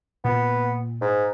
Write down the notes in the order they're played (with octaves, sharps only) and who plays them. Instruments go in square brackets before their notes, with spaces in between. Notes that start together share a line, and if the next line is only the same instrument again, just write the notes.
[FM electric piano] A#2 [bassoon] B3
[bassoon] G#2